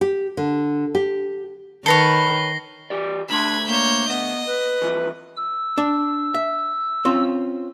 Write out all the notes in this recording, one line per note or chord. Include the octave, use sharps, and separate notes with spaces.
G4
D3
G4
D#3 A4 B4 C#5 A#6 C7 G7
E3 G4 D5
D2 A3 D4 B5 C6 G#6
A#3 C#5 G6
B3 D#5
B4
G2 E3 F3
E6
D4
E5
C4 C#4 F4